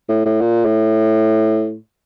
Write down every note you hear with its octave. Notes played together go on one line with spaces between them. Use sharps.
A2
A2
A#2
A2